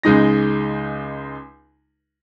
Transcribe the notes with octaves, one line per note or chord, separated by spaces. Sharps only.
C#2 G#3 D#4 A#6